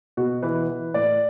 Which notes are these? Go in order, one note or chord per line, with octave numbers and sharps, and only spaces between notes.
B2 F#4
E3 B4
E3
A2 D5